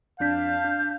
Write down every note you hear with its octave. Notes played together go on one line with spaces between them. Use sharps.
F2 D4 F5 A5 G6 B6
D4